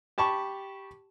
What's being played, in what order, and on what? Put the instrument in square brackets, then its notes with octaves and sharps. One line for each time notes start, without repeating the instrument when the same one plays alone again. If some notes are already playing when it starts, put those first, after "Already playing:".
[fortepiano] G4 A5 B5 C#6